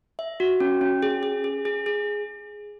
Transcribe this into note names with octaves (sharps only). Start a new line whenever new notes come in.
E5
F#4
C#4
C#4
G#4
G#4
G#4
G#4
G#4